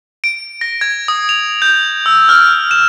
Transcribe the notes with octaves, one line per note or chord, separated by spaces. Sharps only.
D7
A#6
G#6
D#6
F7
G6
E6
F6
E7